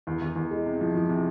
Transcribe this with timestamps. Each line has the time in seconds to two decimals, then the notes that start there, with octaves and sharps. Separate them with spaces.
0.07 E2
0.21 E2
0.36 E2
0.51 G#3
0.66 C3
0.81 F3
0.95 F3
1.10 C3